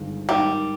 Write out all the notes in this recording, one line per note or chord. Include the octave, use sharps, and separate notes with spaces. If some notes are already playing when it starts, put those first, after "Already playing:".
Already playing: G1 G2 D#3 G#3
G#2 D#3 G3 A#3 D#4